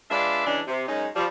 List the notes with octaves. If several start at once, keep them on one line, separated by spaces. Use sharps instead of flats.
G#3 D4 F4 B4 D5 E5
C#3 E3 G#3 C#4 D4
C3
F#2 G#3 C#4 D#4
F3 G3